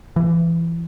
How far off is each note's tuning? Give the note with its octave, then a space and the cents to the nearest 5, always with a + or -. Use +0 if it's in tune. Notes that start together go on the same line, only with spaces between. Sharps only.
E3 +25